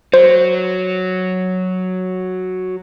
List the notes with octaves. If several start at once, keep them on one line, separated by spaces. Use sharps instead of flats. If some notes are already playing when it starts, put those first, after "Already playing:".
F#3 C5